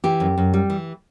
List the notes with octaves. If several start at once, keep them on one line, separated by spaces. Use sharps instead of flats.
E3 G4
F#2
F#2
G3
E3